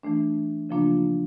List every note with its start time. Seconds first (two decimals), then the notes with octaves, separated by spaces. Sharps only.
0.03 E3 A3 D4
0.69 C#3 F3 A#3 D4 F4